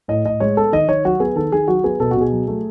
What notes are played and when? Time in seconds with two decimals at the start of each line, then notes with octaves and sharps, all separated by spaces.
0.08 A2 D#5
0.25 A2 D#5
0.40 G#3 C#5
0.57 B3 A4
0.73 D#3 D#5
0.88 D#3 C#5
1.05 F#3 F#4
1.20 B3 G#4
1.36 D#3 A4
1.52 D#3 G#4
1.68 F#3 F#4
1.84 B3 G#4
2.00 B2 A4
2.11 F#4
2.17 B2 G#4
2.32 F#3
2.48 A3